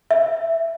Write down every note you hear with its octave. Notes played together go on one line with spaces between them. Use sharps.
E5